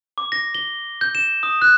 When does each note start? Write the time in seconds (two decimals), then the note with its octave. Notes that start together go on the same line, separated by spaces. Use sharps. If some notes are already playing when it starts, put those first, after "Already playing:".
0.18 D6
0.32 A#6
0.55 G7
1.01 G6
1.15 E7
1.43 D#6
1.62 F#6